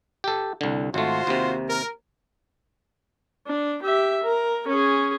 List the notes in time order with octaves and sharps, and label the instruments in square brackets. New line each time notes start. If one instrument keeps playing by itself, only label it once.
[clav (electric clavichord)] G4 A4
C2 D3
[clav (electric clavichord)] G#1 A3 [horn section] F4 F#4 C5
[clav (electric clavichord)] D#2 C3
[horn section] A#4
[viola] D4
G4 E5
A#4
C#4 G#4